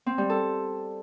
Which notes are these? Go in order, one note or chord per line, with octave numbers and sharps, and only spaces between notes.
C4
G3
A4